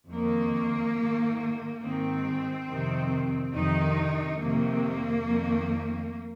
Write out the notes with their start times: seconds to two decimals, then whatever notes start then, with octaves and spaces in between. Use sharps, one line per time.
0.11 F2 D#3 A#3
0.97 G#2 D#3
1.82 G#2 D#3 C4
2.68 F2 C3 D#3
3.53 F2 C3 D#3 D#4
4.39 F2 C3 D#3 A#3
5.24 F2 D#3